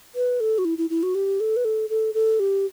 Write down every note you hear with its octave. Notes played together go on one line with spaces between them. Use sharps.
B4
A4
F#4
E4
E4
E4
F#4
G4
A4
B4
A4
A4
A4
G4